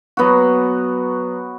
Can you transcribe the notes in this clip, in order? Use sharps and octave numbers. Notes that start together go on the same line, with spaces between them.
F#3 B3 F#4